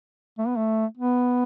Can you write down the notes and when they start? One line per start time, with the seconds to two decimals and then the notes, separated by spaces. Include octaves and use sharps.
0.38 A3
0.47 B3
0.56 A3
0.97 B3